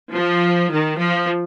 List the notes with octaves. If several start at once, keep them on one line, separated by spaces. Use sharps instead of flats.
F3
D#3
F3